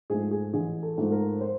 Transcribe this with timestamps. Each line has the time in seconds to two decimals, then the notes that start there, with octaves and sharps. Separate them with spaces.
0.10 G#2 F3 A3 G#4
0.31 G#4
0.53 A1 G#4
0.83 A4
0.97 G#2 F3 A3
1.12 A#4
1.41 C5